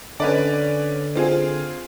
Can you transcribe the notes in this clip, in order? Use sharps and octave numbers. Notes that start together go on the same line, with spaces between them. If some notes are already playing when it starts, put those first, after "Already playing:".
D3 C#4 B4 D5
C4 F4 G#4